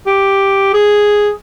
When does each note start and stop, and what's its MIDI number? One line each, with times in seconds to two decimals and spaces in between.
0.07 0.72 67
0.74 1.30 68